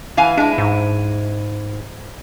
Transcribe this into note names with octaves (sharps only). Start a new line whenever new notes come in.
E3 F5 G#5
G#3 D4 E4
G#2